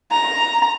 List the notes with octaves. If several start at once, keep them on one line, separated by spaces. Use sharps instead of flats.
A#5